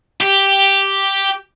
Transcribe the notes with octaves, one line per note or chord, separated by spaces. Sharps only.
G4